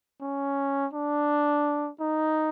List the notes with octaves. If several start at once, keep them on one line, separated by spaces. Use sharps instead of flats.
C#4
D4
D#4